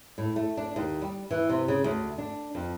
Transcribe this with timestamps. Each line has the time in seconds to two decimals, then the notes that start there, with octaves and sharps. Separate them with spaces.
0.18 A2
0.36 A3
0.57 D4
0.76 D#2
1.01 G3
1.31 E3
1.49 C3
1.68 C#3
1.84 D2
2.18 D4
2.55 F2